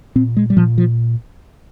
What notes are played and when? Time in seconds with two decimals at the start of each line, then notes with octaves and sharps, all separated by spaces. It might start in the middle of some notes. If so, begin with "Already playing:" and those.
0.15 A#2 C4
0.37 G#3
0.50 G3
0.57 A#2 F3
0.78 F3